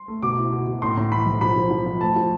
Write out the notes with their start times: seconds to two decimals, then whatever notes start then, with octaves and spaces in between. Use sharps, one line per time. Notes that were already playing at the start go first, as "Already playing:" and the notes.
Already playing: C6
0.08 A3
0.22 B2 D6
0.37 E4
0.52 B2
0.66 B2
0.82 A2 C6
0.97 A2
1.11 E3 B5
1.26 B1
1.41 F3 B5
1.56 F3
1.71 F3
1.86 F3
2.01 A3 A5
2.16 F3